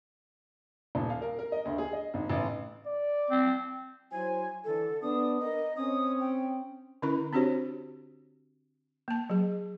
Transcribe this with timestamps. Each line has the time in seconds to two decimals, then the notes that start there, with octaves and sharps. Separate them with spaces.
0.95 D#1
1.10 F5
1.22 A#4
1.39 A#4
1.52 D#5
1.65 D2
1.78 G#4
1.93 D#5
2.14 G#1
2.30 A1
2.86 D5
3.30 C4
4.12 F#3 E4 C5 G#5
4.65 D3 E3 A4
5.02 B3 D4 D#6
5.40 A#4 D#5
5.76 C4 C#4 D#6
6.20 G5
7.02 D3 C#4 E4 A#4 B5
7.33 C4 D4 F#4 G4 C5 C#5
9.08 A#3 A5
9.30 F#3 G#4